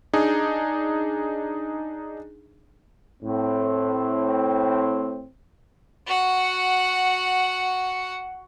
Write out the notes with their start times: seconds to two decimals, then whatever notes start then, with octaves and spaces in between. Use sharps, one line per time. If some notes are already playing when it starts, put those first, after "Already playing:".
0.13 D4 D#4 G#4
3.23 A2 C4
6.07 F#4 F#5